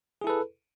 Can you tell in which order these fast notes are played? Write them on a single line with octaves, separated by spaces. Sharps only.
G#4 E4 A4 B4